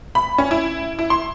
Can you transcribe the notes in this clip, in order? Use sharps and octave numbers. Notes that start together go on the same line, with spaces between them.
B5
C#4
E4
E4
C6